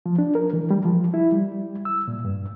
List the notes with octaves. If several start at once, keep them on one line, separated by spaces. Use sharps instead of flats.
F3
D4
A#4
E3
G3
F3
E4
G3
E6
A#2
G2